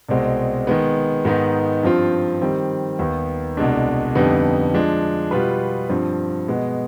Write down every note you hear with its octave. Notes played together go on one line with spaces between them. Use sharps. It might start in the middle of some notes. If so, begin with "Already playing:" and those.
C2 B2 G#3 C4
D#3 G#3 B3
G#2 D#3 B3 D#4
G2 F3 C4 F4
D#3 G3 C4
D#2 D#3 B3
C2 B2 G#3 D4
F2 D3 G3 B3 D#4
F3 G#3 D4
B2 G3 B3 F4 B4
G2 F3 C4
B2 G#3 B3